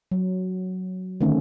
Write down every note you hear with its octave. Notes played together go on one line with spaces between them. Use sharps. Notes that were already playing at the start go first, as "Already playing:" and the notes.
F#3
D3 D#3 A3 C4 C#4